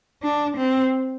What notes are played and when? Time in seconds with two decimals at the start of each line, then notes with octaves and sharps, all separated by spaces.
0.23 D4
0.57 C4